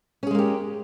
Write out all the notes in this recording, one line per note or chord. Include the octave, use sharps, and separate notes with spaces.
G#3 A#3 C#4 G4 G#4